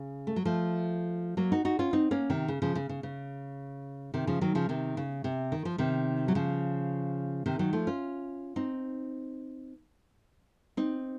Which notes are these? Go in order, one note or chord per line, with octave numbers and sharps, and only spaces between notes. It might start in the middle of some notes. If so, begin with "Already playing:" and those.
Already playing: C#3
A3
F#3
F3 A3
F#3 A#3
D#4 F#4
D#4 F#4
C#4 F4
C4 D#4
A#3 C#4
C3 D#3
C#3
C#3 F3
C#3
C#3
C#3
C3 D#3
C#3 F3
D#3 F#3
C#3 F3
C3 D#3
C#3
C3
D#3
F3
C3 D#3
F#3
C#3 F3
C3 D#3
D#3 F#3
F3 A3
C#4 F4
C4 D#4
C4 D#4